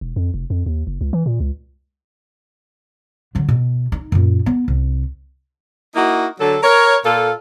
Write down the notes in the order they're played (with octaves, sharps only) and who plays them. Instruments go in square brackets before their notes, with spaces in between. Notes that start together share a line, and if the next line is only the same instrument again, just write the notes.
[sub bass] E1
F2
F1
F2
D#2
F#1
C#2
E3
A#2
C#2
[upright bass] D3 F#3
B2
D#4
F#2 A#2
B3
C2
[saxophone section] A#3 D#4 E4 F#4
D3 F#3 A4
A#4 C#5
A#2 F4 A4